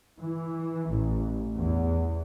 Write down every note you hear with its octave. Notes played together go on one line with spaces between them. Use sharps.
E3
A1
E2